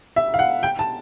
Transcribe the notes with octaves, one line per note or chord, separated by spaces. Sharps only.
E5
F5
F#5
G5
A5